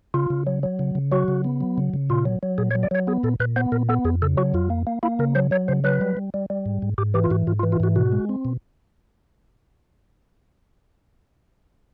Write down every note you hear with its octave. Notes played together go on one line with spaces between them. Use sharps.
C#3 F4
C#3
F#3
F#3
C#3
C#3
F#3 F#4
C#3
B3
F#3
C#3
C#3
A#2 F4
F#3
F#3
A#2 G#4
C#5
F#3
D5
F#3 C#5
B3 G#4
A#2 A4
A#2 B4
B3 C5
A#2 A#4
B3 A4
F2 G#4
C#3 A4
F#3 F#4
F2 F4
A#3
A#3
A#3 E4
C#3 A#4
F#3 C5
F#3 C#5
C#3 C5
F#3 B4
G3
G3
G3
G3
G#2
G#2
G#2 G4
E3 G4
F4
G#2 F#4
G#2 F4
F4
E3
F4
G#2 F#4
B2 F#4
G#3
C4
B2